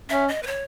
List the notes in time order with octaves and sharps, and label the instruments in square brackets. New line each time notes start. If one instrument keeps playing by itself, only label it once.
[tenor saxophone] C#4 [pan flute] E5
[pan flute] D#5
B4
C#5